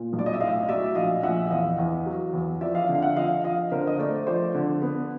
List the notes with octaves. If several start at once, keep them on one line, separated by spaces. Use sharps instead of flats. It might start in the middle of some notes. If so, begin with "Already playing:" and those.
Already playing: A#2
B1
D5
D#5
E5
A2 D#5 F5
D#5
F#3 D5 E5
A#1 D#5 F5
A#1 E5 F#5
E5
E2 D#5 F5
E2
F#3
E2
F3 D5 E5
D#5 F5
D3
F5
E5 F#5
F3 D#5 F5
F3 D#5 F5
D3 A#4 C5
D#5
A3 C5 D5
F3 C5 D5
D3
B3